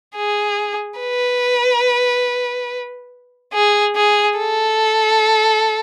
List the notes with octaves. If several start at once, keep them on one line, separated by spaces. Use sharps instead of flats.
G#4
B4
G#4
G#4
A4